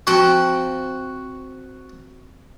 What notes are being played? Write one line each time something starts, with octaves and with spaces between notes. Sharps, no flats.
F3 C4 F#4 G5